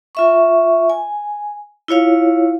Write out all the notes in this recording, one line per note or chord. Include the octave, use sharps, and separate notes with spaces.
F4 E5 C#6
G#5
E4 F4 C#5 F5